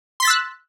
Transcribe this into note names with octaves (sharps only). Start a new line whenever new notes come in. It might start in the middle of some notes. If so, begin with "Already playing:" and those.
C6 E6 F#6 A6 B6